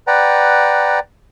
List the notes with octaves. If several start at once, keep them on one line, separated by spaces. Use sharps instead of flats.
B4 D5 F#5 G5 A#5